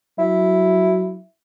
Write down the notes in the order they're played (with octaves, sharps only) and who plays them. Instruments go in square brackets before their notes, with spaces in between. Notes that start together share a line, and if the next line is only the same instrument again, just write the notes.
[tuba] F#3 [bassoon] E4